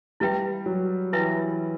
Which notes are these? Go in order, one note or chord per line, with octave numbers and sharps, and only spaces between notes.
G3 E4 B4 E5 G5
F#3
E3 E4 B4 E5 G5